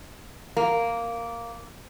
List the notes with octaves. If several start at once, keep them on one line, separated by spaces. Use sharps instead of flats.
A#3